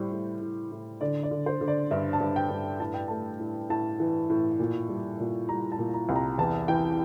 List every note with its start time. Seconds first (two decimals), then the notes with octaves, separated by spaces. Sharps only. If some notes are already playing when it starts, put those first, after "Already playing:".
Already playing: A2 G3 C5
0.12 A2
0.41 A2
0.72 A2
1.01 D3 D5
1.23 D5
1.31 D3
1.46 C5
1.61 D3
1.68 D5
1.91 G2 E5
2.13 A5
2.20 G2
2.36 G5
2.50 G2
2.80 A2 A5
2.94 G5
3.08 A3 A5
3.39 A2
3.70 A2 A5
4.00 E3
4.30 A2
4.59 A#2
4.89 G3
5.20 A#2
5.49 G3 A#5
5.72 A5
5.78 A#2
5.94 A#5
6.09 C2
6.16 A#5
6.38 E2 A5
6.68 E3 G5